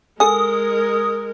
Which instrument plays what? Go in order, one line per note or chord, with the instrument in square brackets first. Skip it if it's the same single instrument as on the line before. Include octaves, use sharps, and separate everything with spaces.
[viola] G#3 A#4 [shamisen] A4 G#5 [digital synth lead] D#6